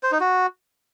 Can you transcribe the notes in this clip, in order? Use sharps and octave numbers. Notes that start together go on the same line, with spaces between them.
C5
D#4
F#4